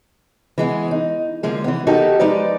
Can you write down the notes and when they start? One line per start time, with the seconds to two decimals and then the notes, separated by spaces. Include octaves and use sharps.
0.58 E3 G#3 B3
0.91 D#4
1.43 D3 F3 G#3 A#3
1.64 E3 B3
1.87 D#4 F#4 G4 A4 A#4
2.20 F3 G#3 D#4 B4 D5